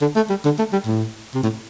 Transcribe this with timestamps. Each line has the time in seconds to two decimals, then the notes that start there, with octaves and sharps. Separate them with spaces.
0.01 D3
0.16 A3
0.30 G3
0.45 D3
0.59 A3
0.73 G3
0.86 A2
1.35 C3
1.43 A2